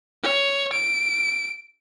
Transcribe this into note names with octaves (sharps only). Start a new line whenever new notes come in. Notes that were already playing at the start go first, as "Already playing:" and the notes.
C#5
D7